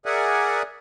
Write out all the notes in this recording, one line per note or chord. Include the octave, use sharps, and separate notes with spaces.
G#4 A#4 D5 E5 F#5 G#5